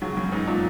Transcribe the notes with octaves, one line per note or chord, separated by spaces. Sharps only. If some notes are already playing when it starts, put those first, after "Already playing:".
C#3 F#3
F#2
G#2
A#2